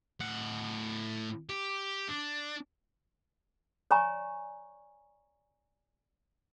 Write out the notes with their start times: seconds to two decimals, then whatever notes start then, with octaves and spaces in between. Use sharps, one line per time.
0.20 A2 F#5
1.49 G4
2.09 D4
3.91 C#5 D5 G#5 A#5 C#6